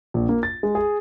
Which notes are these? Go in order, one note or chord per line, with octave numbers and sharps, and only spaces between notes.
A#1
A#3
A6
G#3
G#4